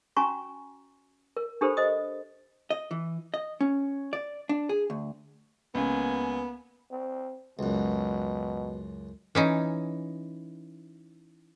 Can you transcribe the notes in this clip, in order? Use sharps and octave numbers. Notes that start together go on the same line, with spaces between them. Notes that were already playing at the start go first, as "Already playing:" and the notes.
C#4 F#4 G#5 A#5 C#6
A#4
D4 G4 A4 A#4 C5 B5
C5 D#5 D#6
D#5
E3
D#5
C#4
D5
D4
G#4
D2
C#2 A#3 B3 G#5
C4
C#2 F#2 B2
E3 C#4 D#4